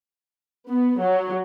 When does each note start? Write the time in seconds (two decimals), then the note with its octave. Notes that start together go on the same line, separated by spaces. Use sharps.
0.69 B3
1.02 F#3